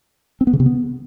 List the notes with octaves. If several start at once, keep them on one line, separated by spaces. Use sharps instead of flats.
C4
B3
C#3
C3
B3